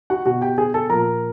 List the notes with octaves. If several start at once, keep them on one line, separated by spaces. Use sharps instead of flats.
F#4 F#5
B2 F#4 F#5
G4 G5
G#4 G#5
A4 A5
A#2 F3 A#4 A#5